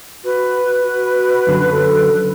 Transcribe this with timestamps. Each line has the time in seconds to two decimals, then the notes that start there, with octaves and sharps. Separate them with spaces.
0.24 F#4 B4
0.82 F#4
1.47 F#2 D3
1.71 A4